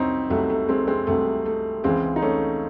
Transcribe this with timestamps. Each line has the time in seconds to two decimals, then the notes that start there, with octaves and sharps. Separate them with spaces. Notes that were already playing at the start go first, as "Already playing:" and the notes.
Already playing: C2 F#3 C4 C#4 D#4 E4
0.30 C2 C3 F#3 A3
0.50 A3
0.69 G#3 C4
0.87 G#3 C4
1.07 C2 C3 F#3 A3
1.45 A3
1.84 C#2 C#3 E3 G#3 C4
2.16 D#4
2.22 A3 C#4